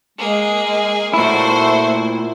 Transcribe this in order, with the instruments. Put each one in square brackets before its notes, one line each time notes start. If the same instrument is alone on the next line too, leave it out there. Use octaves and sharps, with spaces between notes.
[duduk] G#3 [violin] A#3 G#4
[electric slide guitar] A#2 E4 [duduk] A3 [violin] F#4 C5